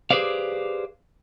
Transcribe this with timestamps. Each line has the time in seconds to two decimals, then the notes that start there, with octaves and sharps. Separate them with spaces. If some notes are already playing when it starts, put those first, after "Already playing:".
0.11 G4 G#4 B4 C5 D5 F5